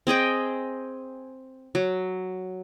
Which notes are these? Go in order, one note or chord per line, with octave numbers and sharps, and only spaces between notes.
C4 G#4 D#5 G5
F#3